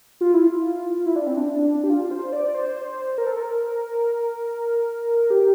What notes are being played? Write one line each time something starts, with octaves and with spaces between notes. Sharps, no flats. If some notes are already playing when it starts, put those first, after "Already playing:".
F4
E4
F4
E4
D4
C4
D4
G4
F4
C5
D5
C5
C5
A#4
A4
A#4
G4